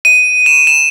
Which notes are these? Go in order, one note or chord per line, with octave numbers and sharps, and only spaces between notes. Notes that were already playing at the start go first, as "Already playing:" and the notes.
D#7
E7
E7